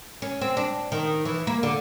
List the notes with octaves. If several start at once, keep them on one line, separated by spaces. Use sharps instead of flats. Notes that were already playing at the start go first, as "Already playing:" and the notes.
C#4
C4
D4
D#3
E3
A#3
D3